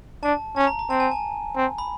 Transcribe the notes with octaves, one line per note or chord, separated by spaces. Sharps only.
D4 A5
C#4 A5
A#5
A#5
C4 A5
G#5
A5
C4
B5